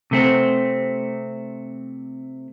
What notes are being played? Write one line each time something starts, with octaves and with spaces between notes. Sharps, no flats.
C3 A3 C4